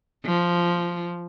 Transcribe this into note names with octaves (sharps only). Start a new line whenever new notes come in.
F3